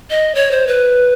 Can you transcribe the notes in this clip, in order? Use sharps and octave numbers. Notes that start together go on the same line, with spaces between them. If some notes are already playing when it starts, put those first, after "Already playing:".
D#5
C#5
C5
B4